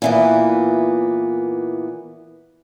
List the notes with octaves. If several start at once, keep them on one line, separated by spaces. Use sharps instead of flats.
A#2 E3 B3